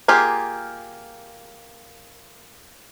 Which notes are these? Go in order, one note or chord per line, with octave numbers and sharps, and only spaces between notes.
A#3 F4 G4 G#4